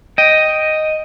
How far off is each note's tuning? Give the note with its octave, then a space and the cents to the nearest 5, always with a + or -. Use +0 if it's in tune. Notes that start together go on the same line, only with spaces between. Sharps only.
D#5 +0 G5 +0